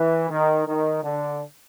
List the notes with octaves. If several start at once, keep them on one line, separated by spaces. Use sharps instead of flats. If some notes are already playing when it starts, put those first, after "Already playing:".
Already playing: E3
D#3
D#3
D3